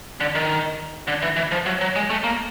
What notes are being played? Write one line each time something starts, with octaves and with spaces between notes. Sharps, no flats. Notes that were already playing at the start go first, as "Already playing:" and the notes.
D3
D#3
D3
E3
E3
F3
F#3
F#3
G#3
A3
A#3